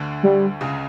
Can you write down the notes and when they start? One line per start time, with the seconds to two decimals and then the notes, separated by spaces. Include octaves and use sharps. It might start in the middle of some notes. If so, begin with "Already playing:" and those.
Already playing: D2 D3
0.23 G3
0.61 C#2 C#3